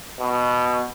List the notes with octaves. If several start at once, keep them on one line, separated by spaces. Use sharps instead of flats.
B2